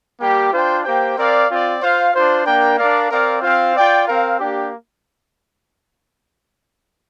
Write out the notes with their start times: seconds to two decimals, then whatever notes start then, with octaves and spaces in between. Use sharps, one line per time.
0.19 G3 A#3 G4
0.51 D4 F4 C5 G5
0.84 A#3 G4 C5 G5
1.17 C4 A#4 D5 F5
1.49 C4 F4 D5
1.81 F4 C5 F5
2.14 D4 F4 C5
2.46 A#3 D4 A#4 G5
2.78 D4 A#4 D5 F5
3.11 C4 A#4 D5 F5
3.43 C4 F4 C5 F5
3.75 F4 D5 G5
4.07 C4 A#4 F5
4.40 A#3 D4 G4